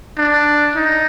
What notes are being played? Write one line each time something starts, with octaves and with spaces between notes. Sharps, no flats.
D4
D#4